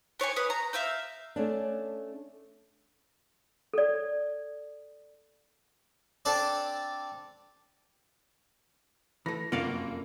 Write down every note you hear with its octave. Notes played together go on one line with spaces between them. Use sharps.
B3 C#5 D5 G#5
B4 D#6
A#5
E5 F5 E6 G6
A3 C#4 D4
A4 D5
C4 D4 A4 D5
E3 A3 A#6
F1 F#2 A#3 F4 F#4 D5 F5